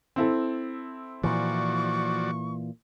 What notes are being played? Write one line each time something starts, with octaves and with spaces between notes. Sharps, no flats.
C4 E4 A4
A#2 E3 F3 F#4 D5 C#6